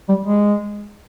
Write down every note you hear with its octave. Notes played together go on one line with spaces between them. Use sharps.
G3
G#3